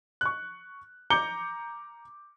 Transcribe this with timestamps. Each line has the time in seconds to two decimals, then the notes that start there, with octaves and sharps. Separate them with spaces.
0.21 C#6 F#6
1.10 A#5 D6 G6 C#7 G7